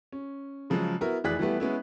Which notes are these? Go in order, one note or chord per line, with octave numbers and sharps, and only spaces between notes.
C#4
C#3 F3 F#3 G#3
B3 E4 F#4 A#4
F1 E3 G#4 D5 F#6 B6
E3 G3 A3 B3
G#3 B3 C#4 E4